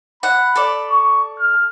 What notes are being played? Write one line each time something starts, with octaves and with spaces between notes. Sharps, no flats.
F#5 B5
A4 D5
C#6
F6